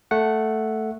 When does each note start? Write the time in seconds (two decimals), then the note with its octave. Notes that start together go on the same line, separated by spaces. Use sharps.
0.11 A3 F#5